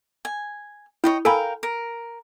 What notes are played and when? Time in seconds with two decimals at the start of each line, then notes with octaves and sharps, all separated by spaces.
0.25 G#5
1.04 E4 C#5 D#5 G5
1.25 A4 A#4 F5 G5 G#5 B5
1.63 A#4